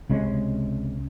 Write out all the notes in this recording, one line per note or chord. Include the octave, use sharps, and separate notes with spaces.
C#2 C3 G#3 C#4